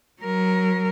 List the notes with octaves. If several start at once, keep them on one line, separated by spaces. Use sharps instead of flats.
F#3 A#4